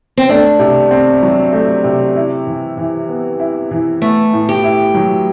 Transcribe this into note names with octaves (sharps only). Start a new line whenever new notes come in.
C4
A3 D4
C3
C4
F#3
A3
C3
E4
E3
E3
B3
E4
E3
A3 B3
A2
G4
E4
F#3